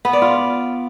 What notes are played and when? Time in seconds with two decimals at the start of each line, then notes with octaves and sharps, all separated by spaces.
0.05 B3
0.13 D5
0.22 F4